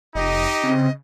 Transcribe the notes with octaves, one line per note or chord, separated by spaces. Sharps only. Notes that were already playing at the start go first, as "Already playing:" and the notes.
F1 D#4 G4 D#5
C#3 C4